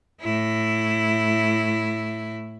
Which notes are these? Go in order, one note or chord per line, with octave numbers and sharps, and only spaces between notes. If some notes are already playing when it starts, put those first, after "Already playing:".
A2 E4